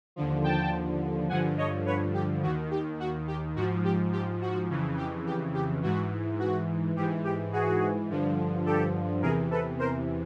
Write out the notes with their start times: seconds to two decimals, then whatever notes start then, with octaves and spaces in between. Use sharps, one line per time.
0.16 D#2 D3 F3
0.44 G5 A5
1.29 G2 D3 F3 F#5 G#5
1.58 C#5 D#5
1.86 B4 C#5
2.14 G4
2.42 D#2 D#3 F#4
2.71 G4
3.00 F#4
3.27 G4
3.55 G#2 F3 F#4
3.84 G4
4.12 G4
4.42 F#4
4.69 F2 C#3 E3
4.97 G4
5.26 G4
5.54 G4
5.82 G#2 E3 F#4
6.39 F#4
6.96 G#2 E3 G4
7.24 G4
7.53 F#4 G#4
8.09 G2 D3 F3
8.66 G4 A4
9.22 E2 C3 E3 G#4 A#4
9.51 A4 B4
9.79 A#4 C5